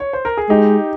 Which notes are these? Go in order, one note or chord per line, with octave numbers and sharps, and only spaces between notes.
C#5
C5
A#4
G#4
G#3 D#4 G4